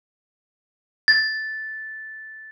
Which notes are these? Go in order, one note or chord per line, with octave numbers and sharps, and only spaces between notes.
A6